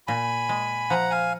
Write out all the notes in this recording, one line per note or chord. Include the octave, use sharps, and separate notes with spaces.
A#2 G#5 B5
G#3
F3 F#5 A#5
F5 G#5